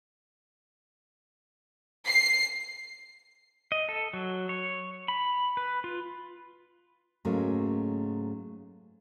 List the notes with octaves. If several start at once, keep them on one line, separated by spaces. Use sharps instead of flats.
C7
D#5
A4
F#3
C#5
B5
B4
F4
G#2 C#3 F#3 A3 A#3